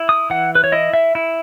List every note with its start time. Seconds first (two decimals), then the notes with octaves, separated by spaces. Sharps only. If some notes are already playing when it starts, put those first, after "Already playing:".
Already playing: E4
0.09 D#6
0.30 E3 F#5
0.55 B4
0.64 C#5
0.72 E4 D#5
0.94 E5
1.15 E4